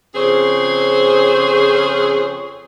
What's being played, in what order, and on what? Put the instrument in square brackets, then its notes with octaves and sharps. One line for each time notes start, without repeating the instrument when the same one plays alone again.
[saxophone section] F2 C#3 C4 G#4 C5 C#5